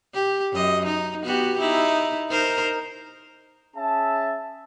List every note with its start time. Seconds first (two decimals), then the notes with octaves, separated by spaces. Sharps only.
0.14 G4
0.53 F#2 D#5
0.86 D#4
1.24 B3 F#4 G4
1.59 D#4 E4
2.29 D#4 A#4 C5
3.76 C#4 G#4 E5 A5